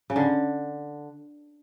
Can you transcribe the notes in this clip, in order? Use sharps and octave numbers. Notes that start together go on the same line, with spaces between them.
C#3
D3